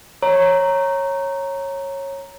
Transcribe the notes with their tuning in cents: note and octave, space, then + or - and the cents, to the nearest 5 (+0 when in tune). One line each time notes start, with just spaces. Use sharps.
C#5 -15 A#5 +0